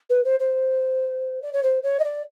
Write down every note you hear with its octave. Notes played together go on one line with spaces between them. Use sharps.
B4
C5
C5
D5
C#5
C5
C#5
D#5
D5